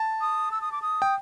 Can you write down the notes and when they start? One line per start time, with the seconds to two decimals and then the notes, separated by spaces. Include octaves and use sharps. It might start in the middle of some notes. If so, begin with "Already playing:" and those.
Already playing: A5
0.21 D#6
0.52 E6
0.61 D#6
0.72 D6
0.82 D#6
1.02 G5